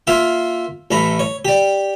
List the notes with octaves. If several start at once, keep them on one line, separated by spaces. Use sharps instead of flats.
A#3 F4 E5 F5
A1 A3 A#5 B5
C#5
G4 D5